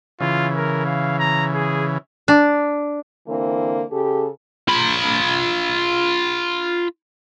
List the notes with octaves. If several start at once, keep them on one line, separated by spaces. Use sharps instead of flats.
C#3 E3 F4
A#4
F5
A#5
G#4
D4
D3 E3 A#3 C4
C#3 G4 A4
F4 B5